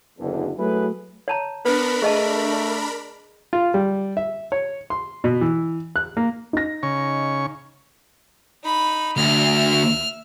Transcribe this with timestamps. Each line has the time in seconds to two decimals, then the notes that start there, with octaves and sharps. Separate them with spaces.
0.19 F#1 E2 D3
0.58 F#3 A3 E4 G#4 A4 B4
1.28 C#5 A5 A#5
1.65 B3 D4 A#4 B4 B5
2.02 A3 G#4 D#5 A5
3.53 F4
3.74 G3
4.17 E5
4.52 C#5
4.90 C6
5.24 B2
5.41 E3
5.96 F#6
6.17 A#3
6.53 D#4 A#6
6.83 C#3 C#6
8.63 D#4 B5
9.17 D2 E5 F6